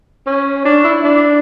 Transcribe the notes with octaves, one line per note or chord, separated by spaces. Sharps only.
C#4
D4
E4
D4